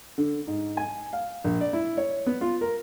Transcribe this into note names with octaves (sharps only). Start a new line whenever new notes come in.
D3
G#2
G#5
F5
A#1
D5
E4
C#5
B3
F4
A#4